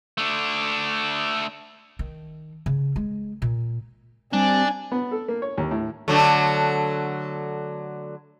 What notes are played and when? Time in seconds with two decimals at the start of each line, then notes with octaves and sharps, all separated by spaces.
0.18 A3 D4
1.99 D#3
2.66 C#3
2.96 G#3
3.42 A#2
4.33 G3 C4 D4 G#5
4.92 B3
5.11 A4
5.28 A#3
5.42 C#5
5.58 D#2
5.71 A2
6.08 D3 F#3 A3